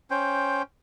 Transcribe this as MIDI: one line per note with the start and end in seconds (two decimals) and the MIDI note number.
0.11 0.62 61
0.11 0.62 72
0.11 0.62 79